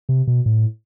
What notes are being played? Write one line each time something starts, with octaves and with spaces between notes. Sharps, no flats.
C3
B2
A2